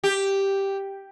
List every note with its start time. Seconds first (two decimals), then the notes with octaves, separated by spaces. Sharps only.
0.04 G4